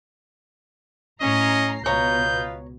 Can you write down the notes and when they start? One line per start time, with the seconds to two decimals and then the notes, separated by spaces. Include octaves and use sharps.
1.21 A2 C#4 D#5 A#5 C7
1.86 C#2 B2 F4 B4 C#5 D#5 A#5 G6